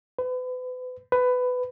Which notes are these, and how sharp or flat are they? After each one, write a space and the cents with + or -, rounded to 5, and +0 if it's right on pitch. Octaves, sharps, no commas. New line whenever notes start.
B4 +35
B4 +15